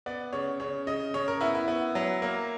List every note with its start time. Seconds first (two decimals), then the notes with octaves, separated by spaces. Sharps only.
0.06 B3 D5
0.33 C#3 C#5
0.60 C#3 C#5
0.87 C#3 D#5
1.14 C#3 C#5
1.28 A#4
1.41 B3 E4
1.55 E4
1.68 B3
1.95 F#3
2.22 A#3